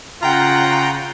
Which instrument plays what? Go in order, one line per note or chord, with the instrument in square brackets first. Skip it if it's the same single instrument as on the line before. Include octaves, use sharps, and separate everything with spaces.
[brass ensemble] C#3 [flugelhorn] F4 [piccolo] F#5 [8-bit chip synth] G5 A#5